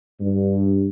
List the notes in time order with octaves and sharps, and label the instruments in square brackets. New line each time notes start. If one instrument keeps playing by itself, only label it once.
[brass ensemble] G2